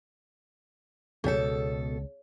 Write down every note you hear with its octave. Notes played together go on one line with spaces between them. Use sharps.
C#2 B2 G#4 A4 C#5